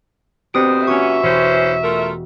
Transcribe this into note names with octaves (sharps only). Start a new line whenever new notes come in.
D2 B2 C4 G4 C5 C6 D#6 D7
A#2 E3 C#4 F#4 E5 C#6
E1 E3 C#4 C5
A3 F4 A#4